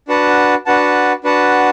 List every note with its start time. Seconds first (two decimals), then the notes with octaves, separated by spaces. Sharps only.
0.08 D4 F#4 B4 F#5 A5
0.66 D4 F#4 B4 F#5 A5
1.24 D4 F#4 B4 F#5 A5